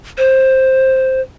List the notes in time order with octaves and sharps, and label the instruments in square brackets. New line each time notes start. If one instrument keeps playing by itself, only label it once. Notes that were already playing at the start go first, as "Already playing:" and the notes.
[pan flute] C5